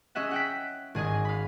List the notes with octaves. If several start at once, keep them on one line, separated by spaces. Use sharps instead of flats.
C#4 G#4 D#5 E5 F#5
F#5 G5 B6
G#1 G#4 D#5 G#5
F5 B5